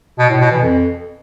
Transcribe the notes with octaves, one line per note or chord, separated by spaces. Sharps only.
B2
A2
B2
E3
F2